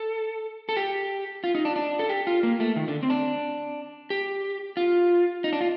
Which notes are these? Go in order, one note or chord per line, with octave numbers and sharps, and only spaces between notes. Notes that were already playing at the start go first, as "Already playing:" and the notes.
Already playing: A4
A4
G4
F4
D#4
D4
D4
A4
G4
F4
A#3
A3
D#3
D3
C4
D4
G4
F4
D#4
D4
F4